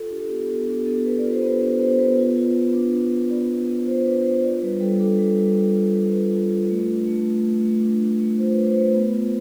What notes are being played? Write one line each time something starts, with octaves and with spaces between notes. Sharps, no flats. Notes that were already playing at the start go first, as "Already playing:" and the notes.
Already playing: F4 A4
D4 G4
B3 G4
B3 A4
D4 G4
B3 A4
B3 B4
D5
F4
C5
B3 B4
D4 B4
B3 C5
B3 B4
F4
F4
B3
D4
D4
B3
B3 D5
B3
B3
F4 C5
D4 B4
D4 C5
F4 D5
G3 B4
G3 A4
D4 A4
G3
G3
F4
F4
G3
F4 B4
F4
F4
A3
D4
A3
F4
A3
A3
D4
D4
A3
F4 C5
B4
D4
C5
A3
B4
B3 B4
F4 B4